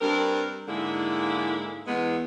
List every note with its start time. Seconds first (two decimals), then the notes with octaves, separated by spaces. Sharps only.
0.01 G2 C4 A#4
0.68 G#2 D3 G#3 A#3 E4
1.87 E2 G#3 B3